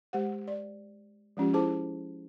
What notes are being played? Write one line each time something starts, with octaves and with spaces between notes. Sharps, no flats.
G#3 G4 C5 F#5
D5
F3 G#3 C#4 F4 G4
E4 G#4 C5 A5 D6